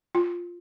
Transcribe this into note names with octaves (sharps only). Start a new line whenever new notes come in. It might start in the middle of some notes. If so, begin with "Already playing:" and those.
F4